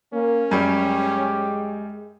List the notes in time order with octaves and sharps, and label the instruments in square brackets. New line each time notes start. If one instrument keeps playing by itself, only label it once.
[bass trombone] A#3 [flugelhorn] C#4
[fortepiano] F#2 G3 [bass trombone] G#3 [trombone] G4